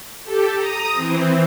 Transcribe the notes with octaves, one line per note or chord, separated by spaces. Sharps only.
G4 A4
A#5 D#6
E3 C4